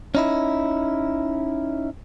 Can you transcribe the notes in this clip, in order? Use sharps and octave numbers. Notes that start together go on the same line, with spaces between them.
C#4 D#4 E4